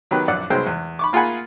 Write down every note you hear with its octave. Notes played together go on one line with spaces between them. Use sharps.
D#3 F#3 B3 G4 B4
A#1 F#2 D5 F#5
C2 F#3 G#3 B3 C5 G5
E2
B5 C#6 D6
A#3 F4 G#4 F#5 G#5 B5